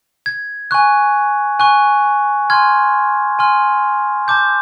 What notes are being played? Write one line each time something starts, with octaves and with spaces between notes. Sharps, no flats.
G#6
G#5 C#6 F#6
G#5 C#6 F#6
G#5 C6 F6 G#6
G#5 C6 F6
A5 D6 G6